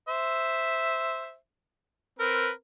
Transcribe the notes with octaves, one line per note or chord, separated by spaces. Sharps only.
C5 E5
C4 A#4 B4